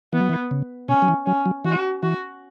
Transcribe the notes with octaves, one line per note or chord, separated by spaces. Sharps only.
E3 B3
F#3
E3
C#3
B2 C#4
F#3
E3
F#3 C#4
F#3
E3 F#4
E3 F#4